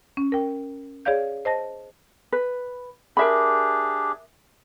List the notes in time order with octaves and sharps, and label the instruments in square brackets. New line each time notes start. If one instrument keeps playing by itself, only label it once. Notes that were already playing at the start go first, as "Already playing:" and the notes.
[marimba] C#4
A#4 G5
G#4 C#5 D5 F5 G6
C5 D#5 A5 A#6
[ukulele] B4
[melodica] D4 G4 G#4 [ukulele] A#4 E5 B5